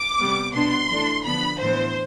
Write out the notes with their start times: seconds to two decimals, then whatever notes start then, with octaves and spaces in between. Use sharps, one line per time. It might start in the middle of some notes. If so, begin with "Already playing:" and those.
Already playing: D6
0.19 C3 G3 B3
0.54 B2 B3 D4 C6
0.90 E3 A3 D4
1.25 D3 F3 B3 D4 B5
1.61 A2 E3 B3 D4 C5